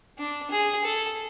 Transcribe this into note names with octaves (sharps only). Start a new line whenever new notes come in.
D4
G#4
A4